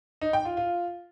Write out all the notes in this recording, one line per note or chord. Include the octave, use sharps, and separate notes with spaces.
D#4
G5
F4
F4